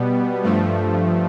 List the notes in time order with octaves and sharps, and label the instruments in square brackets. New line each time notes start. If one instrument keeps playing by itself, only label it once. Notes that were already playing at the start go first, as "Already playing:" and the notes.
Already playing: [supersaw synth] B2 G3 B3
G2 F3 A3